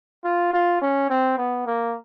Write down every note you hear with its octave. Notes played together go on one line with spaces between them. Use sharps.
F4
F4
C#4
C4
B3
A#3